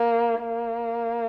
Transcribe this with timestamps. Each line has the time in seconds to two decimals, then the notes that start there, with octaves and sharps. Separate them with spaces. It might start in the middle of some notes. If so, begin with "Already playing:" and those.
Already playing: A#3
0.41 A#3